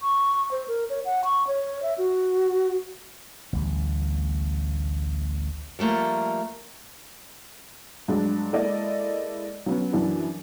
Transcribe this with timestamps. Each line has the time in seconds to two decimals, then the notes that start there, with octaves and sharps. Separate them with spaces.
0.01 C#6
0.51 C5
0.68 A#4
0.90 C#5
1.05 F#5
1.25 C#6
1.47 C#5
1.83 E5
1.98 F#4
3.53 A1 D2 G3
5.79 F3 G3 A3 A#3
8.08 G2 F#3 G#3 D4
8.52 G#3 A#3 E4 A4 D5 D#5
9.66 F#3 B3 C#4
9.92 F#2 E3 D4 E4 F#4